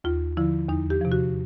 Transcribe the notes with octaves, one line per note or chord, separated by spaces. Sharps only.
D#2 F4
D3 F3 E4
E2 D#4
G4
C3 F3
F#4